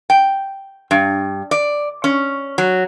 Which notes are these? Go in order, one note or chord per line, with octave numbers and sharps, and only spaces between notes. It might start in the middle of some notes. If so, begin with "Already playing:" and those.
G5
G2
D5
C#4
F#3